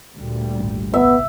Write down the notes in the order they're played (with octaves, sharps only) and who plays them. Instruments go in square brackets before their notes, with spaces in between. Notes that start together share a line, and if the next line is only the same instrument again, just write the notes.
[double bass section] D2 A#2 G3
[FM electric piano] G#1
[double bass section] C2 [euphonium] B3 [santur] E5